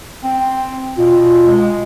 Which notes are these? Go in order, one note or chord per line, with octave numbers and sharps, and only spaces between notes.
C4
B2 F4
G#3